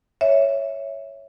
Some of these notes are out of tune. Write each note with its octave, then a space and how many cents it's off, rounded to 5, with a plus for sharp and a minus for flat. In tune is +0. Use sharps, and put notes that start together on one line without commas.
C#5 +0 E5 +0